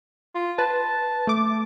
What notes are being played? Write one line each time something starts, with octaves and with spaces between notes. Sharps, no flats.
F4
B4 A5
A3 D6